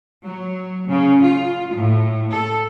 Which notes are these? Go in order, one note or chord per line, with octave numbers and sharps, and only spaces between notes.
F#3
C#3
F4
A2
A4